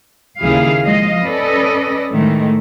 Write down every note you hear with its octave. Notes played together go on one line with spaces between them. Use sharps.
D#2 C#3 E4 G#4 F5
F3 G#3 D#5 F5
C#4 A4 B4 D5 D#5
A2 D#3 E3 G#3 A3